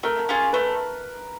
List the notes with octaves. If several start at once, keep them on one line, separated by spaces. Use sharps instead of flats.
A3 A#4
C#4 F4 G#4
A3 B4